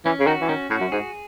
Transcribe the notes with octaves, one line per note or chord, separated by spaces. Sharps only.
E3 C#4
C#3
D#3 F#4
E3
D#3 C#4
A2 F#4
F#2
G#2 G#4